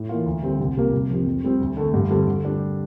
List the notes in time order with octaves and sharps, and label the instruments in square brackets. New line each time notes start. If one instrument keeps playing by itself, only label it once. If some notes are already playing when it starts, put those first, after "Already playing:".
Already playing: [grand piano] A2
E3 A#3 F4
D2
D3 G3 C4
C2
C3 G3 A#3 F4
C2
C3 F3
F2
C3 G3 C4
D2
D3 A3
G2
D3 G3 C4
D3
G3 D4 G4